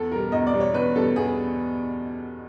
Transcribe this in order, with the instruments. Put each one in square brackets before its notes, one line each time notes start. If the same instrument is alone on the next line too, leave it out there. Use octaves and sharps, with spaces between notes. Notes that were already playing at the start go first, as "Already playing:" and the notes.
Already playing: [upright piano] E2 A4
B2 G3 A#4
E2 D#5
D5
B2 G3
C#5
E2 B4
B2 G3 A4
E2 G#4